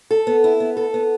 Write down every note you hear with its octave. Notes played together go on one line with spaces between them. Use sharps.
A4
B3
E4
B3
A4
B3